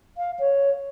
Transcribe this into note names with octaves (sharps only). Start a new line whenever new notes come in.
F5
C#5